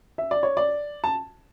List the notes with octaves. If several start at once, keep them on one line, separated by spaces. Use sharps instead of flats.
E5
D5
C#5
D5
A5